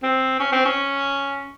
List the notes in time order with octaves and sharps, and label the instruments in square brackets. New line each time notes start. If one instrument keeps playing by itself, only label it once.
[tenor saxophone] C4
C#4
C4
C#4